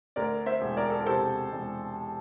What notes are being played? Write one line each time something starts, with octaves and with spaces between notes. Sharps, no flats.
D2 A#4 D5
C5 E5
E1
A#4 D5
A4
A#4
C3 A4 C5
E1